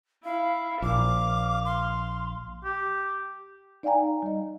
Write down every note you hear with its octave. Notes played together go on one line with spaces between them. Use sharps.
E4 F5
A#1 F5 D6
C6
G4
D#4 D5 F5 G5 G#5 A#5
G3 D#5